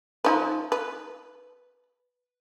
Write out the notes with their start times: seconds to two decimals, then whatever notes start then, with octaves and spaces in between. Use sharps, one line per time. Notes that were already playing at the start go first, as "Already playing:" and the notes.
0.24 F3 D#4 B4
0.72 B4